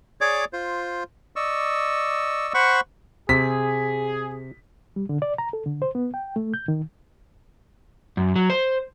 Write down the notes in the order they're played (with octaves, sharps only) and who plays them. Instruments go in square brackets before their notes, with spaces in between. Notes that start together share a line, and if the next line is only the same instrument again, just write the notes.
[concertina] G#4 C#5 D5 D6
F4 C5
D5 D#5 C#6 E6
C5 F#5 B5 C#6
[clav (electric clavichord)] C3 [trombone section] G#4 [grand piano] B6
[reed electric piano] G3
D3
D5
A#5
A4
D3
C5
B3
G5
A3
G6
D#3
[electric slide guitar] F#2
F#3
C5